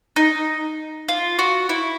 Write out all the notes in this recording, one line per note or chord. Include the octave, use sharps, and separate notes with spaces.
D#4
F4
F#4
E4